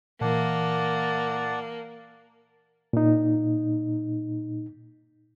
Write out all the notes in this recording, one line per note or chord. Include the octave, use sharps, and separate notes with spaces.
A#2 E3 A#3 D5 F#5 A5
A#2 D#4